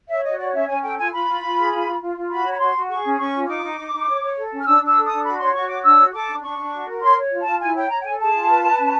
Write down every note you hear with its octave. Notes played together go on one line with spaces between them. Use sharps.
C#5 E5
F#4 D#5
C#5 D5
C#4 E5
C#4 G#5
A4 G5
F4 G#5
F4 B5
F4
F4
G#4
F4
F4
F4
F4
F#4 B5
C#5
B5
F#4 C6
F#4
G#4 C#6
C#4
C#4 C#6
F4
D#4 D6
D#4
D#4
D#4
C#5
C#5
A4
C#4
F6
D4 E6
D4
E6
A4
D#6
D4
F#4 B5
C#5 C6
F#4 C#6
C#5 D6
D4 E6
F#4
A4 D6
D4
D4 C#6
D4
F#4
A#4
C#5 C6
C#5
F4
F4 A5
E4 G#5
C#5 G5
C#5 A#5
G5
A4 G#5
G#4 A5
F4
B4
B4
C#4